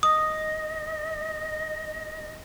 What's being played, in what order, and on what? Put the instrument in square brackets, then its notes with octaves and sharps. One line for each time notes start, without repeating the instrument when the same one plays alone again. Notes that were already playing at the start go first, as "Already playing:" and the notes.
[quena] D#5 [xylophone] D#6